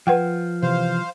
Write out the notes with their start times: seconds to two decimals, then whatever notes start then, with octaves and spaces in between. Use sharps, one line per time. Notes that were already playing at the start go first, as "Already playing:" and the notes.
0.07 F3 B4 F#5 G5
0.63 C3 E3 C5 F5